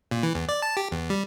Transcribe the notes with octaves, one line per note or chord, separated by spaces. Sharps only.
A#2
E3
E2
D5
A5
G4
E2
G3